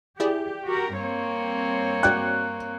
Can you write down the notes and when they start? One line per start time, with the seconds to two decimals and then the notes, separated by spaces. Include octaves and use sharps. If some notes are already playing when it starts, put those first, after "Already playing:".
0.20 E4 G4 G#4 D5
0.67 F#4 G4 A#4
0.97 G2 A#3 C4 C#5
2.03 F#4 D5 G5 F#6